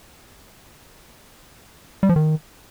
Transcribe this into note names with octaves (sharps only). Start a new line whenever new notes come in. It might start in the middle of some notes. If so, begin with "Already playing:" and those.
G3
F3
D#3